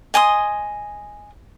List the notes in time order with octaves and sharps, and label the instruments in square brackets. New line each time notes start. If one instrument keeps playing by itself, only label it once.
[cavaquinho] D#5 G#5 C6 D#6